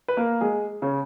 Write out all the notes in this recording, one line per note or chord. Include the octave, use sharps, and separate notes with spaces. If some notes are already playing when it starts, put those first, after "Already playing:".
B4
A#3 A#4
G#3 G#4
C#3 C#4